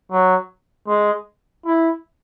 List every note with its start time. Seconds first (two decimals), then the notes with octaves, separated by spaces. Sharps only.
0.12 F#3
0.88 G#3
1.66 E4